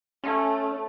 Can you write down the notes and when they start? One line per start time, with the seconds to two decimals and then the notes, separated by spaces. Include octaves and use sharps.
0.24 A3 C#4